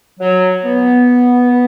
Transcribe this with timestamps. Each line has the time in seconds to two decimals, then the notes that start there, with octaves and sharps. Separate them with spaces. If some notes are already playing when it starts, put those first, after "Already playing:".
0.20 F#3
0.65 B3